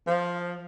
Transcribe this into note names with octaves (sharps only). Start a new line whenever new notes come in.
F3